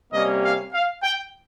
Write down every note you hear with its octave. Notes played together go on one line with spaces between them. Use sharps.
C3 G3 A#3 C#4 D#5
F5
F5
G5